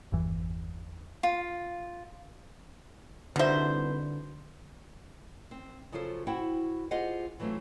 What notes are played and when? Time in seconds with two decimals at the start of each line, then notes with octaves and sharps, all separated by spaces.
0.12 G1 E2 E3
1.23 F4
3.36 C2 B2 D3 D4 D#4 B4 C5 E5
5.51 C4
5.92 C#3 F3 F#3 F4 A4 C5
6.27 E4 F#4 C5 F#5 G5
6.91 F4 G4 G#4 C5 D#5 F#5
7.39 E3 F#3 A3 C4 F4